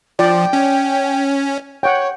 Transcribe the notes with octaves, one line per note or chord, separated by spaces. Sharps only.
F3 D5 G5
C#4
C#5 F#5 G5